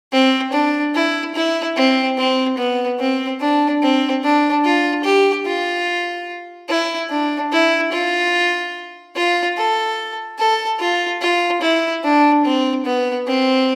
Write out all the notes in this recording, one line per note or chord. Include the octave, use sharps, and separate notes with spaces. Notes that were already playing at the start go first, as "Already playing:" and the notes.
C4
D4
E4
E4
C4
C4
B3
C4
D4
C4
D4
F4
G4
F4
E4
D4
E4
F4
F4
A4
A4
F4
F4
E4
D4
C4
B3
C4